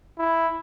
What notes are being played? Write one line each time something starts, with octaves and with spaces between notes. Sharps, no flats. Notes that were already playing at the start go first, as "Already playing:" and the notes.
E4